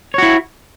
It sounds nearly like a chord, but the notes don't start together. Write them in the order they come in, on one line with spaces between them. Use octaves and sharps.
C#5 F#4 E4